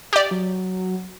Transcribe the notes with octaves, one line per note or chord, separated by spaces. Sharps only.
G4 D5 D6
F#3